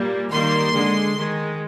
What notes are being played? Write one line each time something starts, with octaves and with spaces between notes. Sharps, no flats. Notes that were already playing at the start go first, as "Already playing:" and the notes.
Already playing: A#2 G3 A#3
D#3 G3 A#3 C6
D3 G#3
D#3 G#3